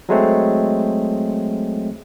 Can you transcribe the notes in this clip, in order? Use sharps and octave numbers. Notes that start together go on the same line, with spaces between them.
F#3 G#3 A3 C4